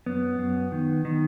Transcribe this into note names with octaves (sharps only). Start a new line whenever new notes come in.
F#2 B3
F#2
D#3
D#3